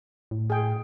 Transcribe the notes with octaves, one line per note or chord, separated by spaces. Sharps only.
A2
G#4 G5